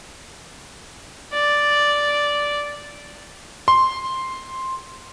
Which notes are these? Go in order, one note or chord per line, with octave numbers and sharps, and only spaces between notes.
D5
C6